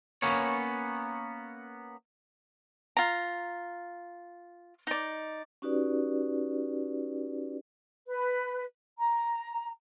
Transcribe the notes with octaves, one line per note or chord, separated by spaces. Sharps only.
A#3 B3 C#4 C#5
F4 A#5
D#4 D5
C#4 D#4 F#4 G4 B4 D5
B4
A#5